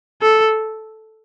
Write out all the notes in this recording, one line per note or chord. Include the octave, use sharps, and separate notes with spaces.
A4